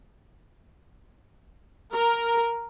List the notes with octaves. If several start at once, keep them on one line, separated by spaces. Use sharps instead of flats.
A#4